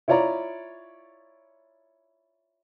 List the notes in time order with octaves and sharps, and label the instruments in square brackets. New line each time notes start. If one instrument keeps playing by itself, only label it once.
[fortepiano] E4 F4 C#5 D5 A#5